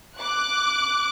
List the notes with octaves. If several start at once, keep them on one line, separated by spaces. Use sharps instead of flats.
D6 F#6